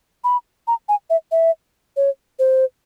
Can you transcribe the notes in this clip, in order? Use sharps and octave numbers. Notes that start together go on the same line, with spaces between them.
B5
A#5
G#5
E5
E5
C#5
C5